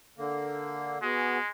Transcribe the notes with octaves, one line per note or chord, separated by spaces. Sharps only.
D3 A#3
G#3 B3 F#4 G#4